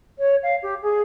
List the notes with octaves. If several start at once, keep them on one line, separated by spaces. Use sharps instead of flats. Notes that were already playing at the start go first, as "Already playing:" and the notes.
C#5
F5
G4
G#4